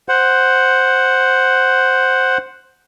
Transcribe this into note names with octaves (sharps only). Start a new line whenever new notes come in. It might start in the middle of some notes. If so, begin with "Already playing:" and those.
C5 F#5